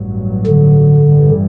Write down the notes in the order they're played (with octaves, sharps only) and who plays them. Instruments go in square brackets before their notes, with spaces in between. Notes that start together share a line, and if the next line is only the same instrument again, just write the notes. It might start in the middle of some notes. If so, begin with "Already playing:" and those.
Already playing: [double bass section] A1 G2 F#3
[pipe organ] D3
[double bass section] A1 G2 E3 G3